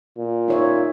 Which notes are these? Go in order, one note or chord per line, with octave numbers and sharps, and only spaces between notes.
A#2
D#4 C#5 E5